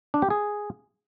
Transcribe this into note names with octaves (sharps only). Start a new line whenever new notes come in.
D4
G4
G#4